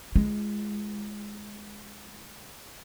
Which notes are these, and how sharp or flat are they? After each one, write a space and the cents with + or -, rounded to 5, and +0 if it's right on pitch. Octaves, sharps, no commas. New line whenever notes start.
G#3 +0 F4 -35